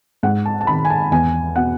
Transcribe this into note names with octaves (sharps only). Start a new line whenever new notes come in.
G#2 F#5
A5
A5
D#3 B5
G#5
A5
E2 G#5
B2 F#5